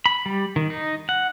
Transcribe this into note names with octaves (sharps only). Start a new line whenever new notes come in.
B5
G3
D#3
D#4
F#5